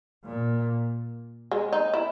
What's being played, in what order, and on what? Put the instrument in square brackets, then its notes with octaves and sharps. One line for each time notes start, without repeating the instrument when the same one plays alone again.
[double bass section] A#2
[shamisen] G#3
D#4
E4